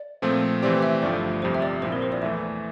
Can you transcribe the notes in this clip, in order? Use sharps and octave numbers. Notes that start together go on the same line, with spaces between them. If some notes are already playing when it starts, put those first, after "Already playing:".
Already playing: D5
A#2 F3 A3 C4
C3 E3 A3 C4 G4 D5
E5
G1 G2 F3 A3 D5
G1 F2 C3 G3 C5
E5
D5
A#1 A#2 F3 C4 E4 C5
A#4
C5
D5
E2 E3 A3 E5